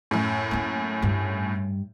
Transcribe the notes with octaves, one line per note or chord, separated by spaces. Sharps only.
F#2 A2
A3 A#3
G2 G3